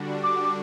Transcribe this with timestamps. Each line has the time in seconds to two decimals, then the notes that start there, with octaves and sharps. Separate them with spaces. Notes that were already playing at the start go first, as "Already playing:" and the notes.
Already playing: D3 G3 D4 F#4
0.23 D6
0.44 D6